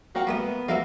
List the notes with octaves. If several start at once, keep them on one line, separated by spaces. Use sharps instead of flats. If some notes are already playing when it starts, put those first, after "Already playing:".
A#3 F#4 F5 G5
G3 A3 B3 D#6
F#3 A3 A#3 A4 E5 F5